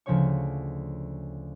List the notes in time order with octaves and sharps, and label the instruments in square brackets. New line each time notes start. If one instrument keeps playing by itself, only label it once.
[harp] D2 C#3 F3 C#4 C#5 C#6